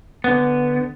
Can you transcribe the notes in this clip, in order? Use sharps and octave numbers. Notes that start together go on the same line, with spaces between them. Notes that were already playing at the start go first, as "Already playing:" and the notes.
D3 B3